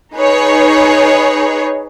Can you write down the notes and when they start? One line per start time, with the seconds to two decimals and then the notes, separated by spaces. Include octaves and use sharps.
0.15 D#4 G#4 B4 C#5